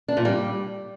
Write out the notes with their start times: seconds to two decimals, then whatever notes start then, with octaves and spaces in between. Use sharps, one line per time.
0.08 D4
0.17 A#2
0.25 G3